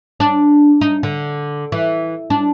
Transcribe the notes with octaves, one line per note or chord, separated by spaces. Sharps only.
D4
D#4
D3
E3
D4